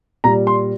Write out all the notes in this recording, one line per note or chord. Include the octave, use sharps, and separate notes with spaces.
A#2 G3 A#5
C6